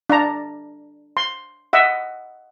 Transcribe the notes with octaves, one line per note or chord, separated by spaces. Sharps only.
D4 A#5
C6
D#5 E5 F#5